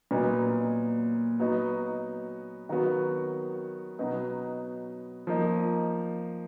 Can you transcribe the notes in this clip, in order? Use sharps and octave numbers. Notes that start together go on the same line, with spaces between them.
A#2 F#3 B3 D#4
F#3 B3 D#4 F#4
D#3 F#3 B3 F#4
B2 F#3 B3 D#4
F3 A#3 D#4